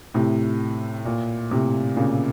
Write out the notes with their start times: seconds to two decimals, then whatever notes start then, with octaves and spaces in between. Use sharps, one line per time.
0.14 A2 C3
1.05 A#2
1.51 A2 C3
1.96 A#2 C#3